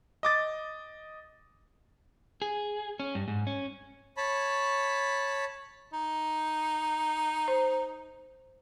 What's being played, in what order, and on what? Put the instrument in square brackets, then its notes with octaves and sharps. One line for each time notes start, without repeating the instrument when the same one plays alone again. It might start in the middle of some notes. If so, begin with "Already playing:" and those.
[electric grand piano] D#5 D6 A6
[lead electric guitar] G#4
C#4
G2
G#2
C#4
[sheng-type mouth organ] C#5 A5 B5
[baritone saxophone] D#4
[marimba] C5